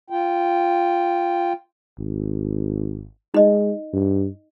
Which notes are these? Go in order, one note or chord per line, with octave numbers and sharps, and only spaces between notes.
F4 G5
G#1
G#3 D#4 D#5
G2